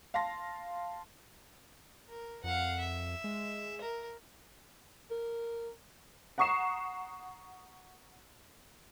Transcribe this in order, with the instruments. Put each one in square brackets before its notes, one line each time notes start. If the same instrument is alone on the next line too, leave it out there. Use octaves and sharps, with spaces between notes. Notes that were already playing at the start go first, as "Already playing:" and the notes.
[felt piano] F5 A5 C6 A#6
[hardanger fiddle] A#4
[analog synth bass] F2 [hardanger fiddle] F5 F#5
[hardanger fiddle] E5
[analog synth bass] G#3
[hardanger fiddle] A#4
[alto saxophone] A#4
[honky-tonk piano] F#5 A#5 C#6 D#6 C7 E7